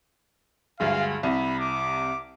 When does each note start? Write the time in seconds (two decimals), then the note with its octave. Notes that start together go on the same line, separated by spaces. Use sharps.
0.80 D2 G2 G#3 F5
1.23 C2 C3 B5
1.60 D6